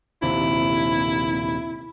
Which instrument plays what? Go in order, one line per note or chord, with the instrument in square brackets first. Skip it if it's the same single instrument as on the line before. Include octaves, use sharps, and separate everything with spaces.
[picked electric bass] A#1 D#2 C3 [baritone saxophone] E4